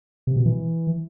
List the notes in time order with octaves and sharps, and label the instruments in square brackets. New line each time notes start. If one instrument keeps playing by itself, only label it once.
[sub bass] C3
B2
E3